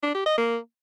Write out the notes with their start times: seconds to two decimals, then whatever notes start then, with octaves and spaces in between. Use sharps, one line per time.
0.03 D4
0.15 G4
0.26 D#5
0.38 A#3